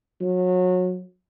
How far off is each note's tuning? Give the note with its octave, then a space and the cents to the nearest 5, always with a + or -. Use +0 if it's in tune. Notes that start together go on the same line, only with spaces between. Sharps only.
F#3 -25